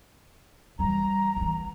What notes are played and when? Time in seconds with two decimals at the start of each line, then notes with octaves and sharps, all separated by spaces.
0.79 E3 G3 A#5
1.37 E3 B3